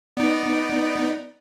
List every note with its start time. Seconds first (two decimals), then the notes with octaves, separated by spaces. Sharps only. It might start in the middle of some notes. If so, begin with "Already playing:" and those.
0.17 B3 D#4 D5